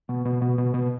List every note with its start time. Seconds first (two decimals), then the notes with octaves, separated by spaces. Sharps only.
0.09 B2
0.25 B2
0.42 B2
0.58 B2
0.74 B2